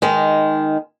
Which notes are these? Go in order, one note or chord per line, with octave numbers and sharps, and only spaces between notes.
D#3 G#3